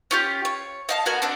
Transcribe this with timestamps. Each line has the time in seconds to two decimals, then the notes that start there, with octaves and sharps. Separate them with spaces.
0.11 C#4 F4 G4
0.45 C#5
0.89 D#5 F5 A5
1.06 B3 F#4 A#4 G#5
1.22 C4 D4 F#4